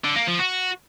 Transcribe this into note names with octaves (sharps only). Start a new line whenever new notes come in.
D3
A#3
F3
F#4